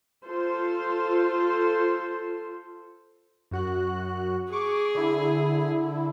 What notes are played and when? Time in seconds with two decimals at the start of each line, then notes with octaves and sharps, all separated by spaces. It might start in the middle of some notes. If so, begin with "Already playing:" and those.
0.24 F4 A4 C5
3.51 F#2 F#4 F#6
4.52 G#4 C#6 D6
4.95 D3 E4